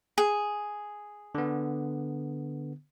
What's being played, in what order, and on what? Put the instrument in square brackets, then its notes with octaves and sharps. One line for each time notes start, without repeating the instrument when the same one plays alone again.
[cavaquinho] G#4
[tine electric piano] D3 B3